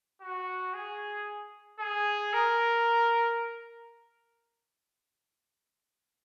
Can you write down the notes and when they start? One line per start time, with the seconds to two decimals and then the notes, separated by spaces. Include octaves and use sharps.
0.21 F#4
0.74 G#4
1.79 G#4
2.33 A#4